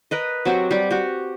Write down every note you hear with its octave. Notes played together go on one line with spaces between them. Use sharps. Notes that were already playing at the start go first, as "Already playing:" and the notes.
A#4 B4 D#5
F#3 C4 F#4 G4
G3 G4
F#4 G4